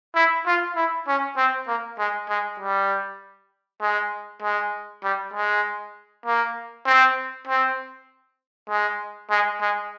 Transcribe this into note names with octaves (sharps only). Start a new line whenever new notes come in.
E4
F4
E4
C#4
C4
A#3
G#3
G#3
G3
G#3
G#3
G3
G#3
A#3
C4
C4
G#3
G#3
G#3